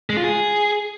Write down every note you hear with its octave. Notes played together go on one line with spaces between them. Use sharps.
G#3
F4
G#4